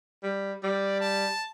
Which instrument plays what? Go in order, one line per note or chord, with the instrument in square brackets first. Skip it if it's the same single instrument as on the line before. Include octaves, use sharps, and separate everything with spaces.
[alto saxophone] G3
[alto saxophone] G3 [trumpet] D5
[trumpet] A5